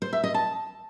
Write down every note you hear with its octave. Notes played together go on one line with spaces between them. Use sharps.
C5
E5
D#5
A5